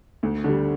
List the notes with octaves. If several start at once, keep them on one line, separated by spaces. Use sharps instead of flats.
D2
D3 G3